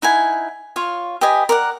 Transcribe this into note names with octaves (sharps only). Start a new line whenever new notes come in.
D#4 E4 F#5 G#5
F4 C#5 F5
G4 B4 D#5 G#5
A#4 D5 F#5